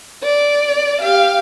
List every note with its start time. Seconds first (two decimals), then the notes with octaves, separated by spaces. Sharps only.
0.24 D5
1.01 G4 F5